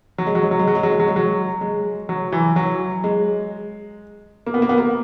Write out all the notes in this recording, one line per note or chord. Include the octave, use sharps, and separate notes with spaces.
F#3
G#3
F#3
G#3
F#3
G#3
F#3
G#3
F#3
G#3
F#3
G#3
F#3
G#3
F#3
E3
F#3
G#3
A#3
B3
A#3
B3
A#3